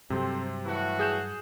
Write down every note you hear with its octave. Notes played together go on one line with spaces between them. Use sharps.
G2 C3 F#3 C4 A4 C5
A2 E3 F#4
G#4 G6 E7